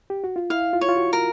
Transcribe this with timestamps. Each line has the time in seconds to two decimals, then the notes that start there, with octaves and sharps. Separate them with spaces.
0.10 G4
0.24 F#4
0.36 F4
0.50 E4 F5
0.73 F4
0.81 C#5
0.89 F4
0.97 F#4
1.13 A#4